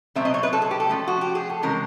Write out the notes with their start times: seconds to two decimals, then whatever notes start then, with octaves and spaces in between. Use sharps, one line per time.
0.15 B2 F#3 A3 C4 E5
0.25 D#5
0.34 C#5
0.43 B4
0.53 A4
0.62 G#4
0.71 G4
0.80 A4
0.89 F3 A3 C#4
1.07 F#4
1.21 G4
1.35 G#4
1.50 A4
1.63 C3 E3 G#3 C#4 A#4